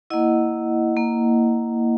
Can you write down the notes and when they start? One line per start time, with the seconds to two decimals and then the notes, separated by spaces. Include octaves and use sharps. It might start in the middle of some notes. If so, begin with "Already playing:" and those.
0.10 A#3 E4 D#5 F#5
0.97 A#3